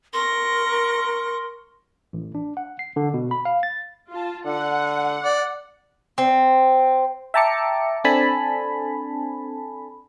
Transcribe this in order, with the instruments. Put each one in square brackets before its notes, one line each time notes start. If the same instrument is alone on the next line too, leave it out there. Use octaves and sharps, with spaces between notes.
[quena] A#4 [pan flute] C6 [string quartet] C#6 A#6
[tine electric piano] A1
D4
F#5
C7
D3
B2
B5
F5
A6
[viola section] F4 A5
[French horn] D3 [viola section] F#5
[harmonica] D5
[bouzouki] C4
[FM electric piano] E5 G5 A5 A#5 D6 C#7
C4 D4 A4 G#5 A5 B5